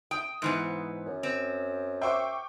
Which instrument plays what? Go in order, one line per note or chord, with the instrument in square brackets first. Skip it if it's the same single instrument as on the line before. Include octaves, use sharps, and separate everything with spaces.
[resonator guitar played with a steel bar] G5 [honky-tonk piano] D#6
[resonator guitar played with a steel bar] G#2 E3 B3 [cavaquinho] C5 A#5 C6
[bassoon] F#2
[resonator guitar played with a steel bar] C4
[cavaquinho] C5 E5 F#5 [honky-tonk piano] G5 C#6 D6